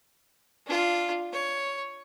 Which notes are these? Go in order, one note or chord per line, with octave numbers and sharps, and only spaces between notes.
D4 F4
C#5